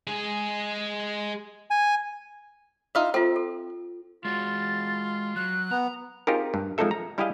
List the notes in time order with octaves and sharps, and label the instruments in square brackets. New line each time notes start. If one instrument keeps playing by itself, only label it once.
[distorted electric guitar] G#3 G#4
[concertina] G#5
[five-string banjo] D#4 F4 E5
[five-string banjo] C4 [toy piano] F4 A4
[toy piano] A4
[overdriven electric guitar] G#3 F#4 [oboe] F4 [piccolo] A6
[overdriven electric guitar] F#3 [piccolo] F#6
[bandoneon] B3 [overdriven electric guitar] A#5
[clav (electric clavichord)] C4 D#4 F4 G4 G#4 A#4
G2
F3 G#3 C4 D#4 A4 E5
A#5
G3 E4 G4 G#4 D#5 F5